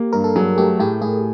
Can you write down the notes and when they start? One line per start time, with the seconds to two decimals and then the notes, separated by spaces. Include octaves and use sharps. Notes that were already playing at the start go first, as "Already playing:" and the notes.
Already playing: A#3 G4
0.13 G2 A#4
0.24 A4
0.36 F#3 G#4
0.57 A3 G4
0.79 A2 G4
1.01 A2 G#4